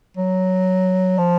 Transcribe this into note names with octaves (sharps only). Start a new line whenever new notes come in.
F#3
F3